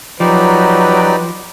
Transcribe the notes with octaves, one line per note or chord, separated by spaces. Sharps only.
F3 F#3 D#4 G4 B4 D5